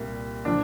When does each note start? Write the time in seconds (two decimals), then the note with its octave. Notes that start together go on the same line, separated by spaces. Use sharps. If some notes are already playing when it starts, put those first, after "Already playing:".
Already playing: C2 A#2 G3 A#3
0.45 A#2 F3 D4